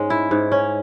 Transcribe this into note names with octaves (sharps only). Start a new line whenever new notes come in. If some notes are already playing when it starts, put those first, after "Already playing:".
Already playing: G#2 G#3 C#4
E4
G#2
C#4